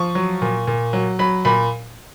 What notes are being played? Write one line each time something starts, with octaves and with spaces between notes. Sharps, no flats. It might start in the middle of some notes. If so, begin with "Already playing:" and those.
Already playing: F3 C#6
F#3
A#2
A#2
F#3
F#3 B5
A#2 B5